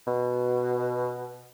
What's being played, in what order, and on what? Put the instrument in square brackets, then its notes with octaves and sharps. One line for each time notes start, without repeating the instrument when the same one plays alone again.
[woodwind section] B2